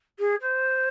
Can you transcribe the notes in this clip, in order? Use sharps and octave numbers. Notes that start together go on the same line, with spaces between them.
G#4
C5